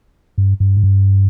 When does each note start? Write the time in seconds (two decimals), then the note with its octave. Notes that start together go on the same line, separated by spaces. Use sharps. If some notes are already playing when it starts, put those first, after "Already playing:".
0.38 G2
0.60 G2
0.77 G#2
0.83 G2